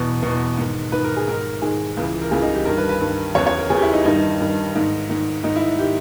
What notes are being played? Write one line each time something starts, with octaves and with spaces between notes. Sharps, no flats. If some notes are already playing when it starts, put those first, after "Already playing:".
Already playing: E2 B2
E2 B2
G#2 D#3
G#2 D#3 B4
A#4
G#4
G#2 D#3 A#4
G#2 D#3 G#4
C#2 C#3 E3
A#4
C#2 C#3 E3 G#4
D#4
G4
G2 D#3 A#4
B4
B4
G2 D#3
E2 C#3 E3 C#5
C#5
A#4
E2 C#3 E3 G#4
G4
E4
D#4
G2 D#3 D#4
G2 D#3
G#2 D#3
G#2 D#3
G#2 D#3 D#4
E4
D#3 G4